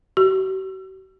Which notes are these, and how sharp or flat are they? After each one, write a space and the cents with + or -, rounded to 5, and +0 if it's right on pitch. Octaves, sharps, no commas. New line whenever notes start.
F#4 +45